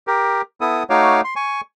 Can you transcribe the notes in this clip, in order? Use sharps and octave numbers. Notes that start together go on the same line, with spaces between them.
G4 A#4
B3 E4 A4 D#6
A3 D#4 F#4 C#5 F5 D6
C6
G#5 C#6